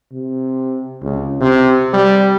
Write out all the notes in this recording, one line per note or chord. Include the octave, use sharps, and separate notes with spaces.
C3
C#2
C3
G3